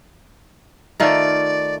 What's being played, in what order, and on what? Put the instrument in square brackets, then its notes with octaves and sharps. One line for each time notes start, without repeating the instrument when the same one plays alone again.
[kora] D#3 A3 F4 [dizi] D5